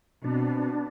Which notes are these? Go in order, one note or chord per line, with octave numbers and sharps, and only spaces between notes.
B2 C4 D4